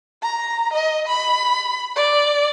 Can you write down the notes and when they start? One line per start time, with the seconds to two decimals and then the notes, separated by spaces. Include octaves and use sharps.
0.22 A#5
0.73 D#5
1.07 B5
1.96 D5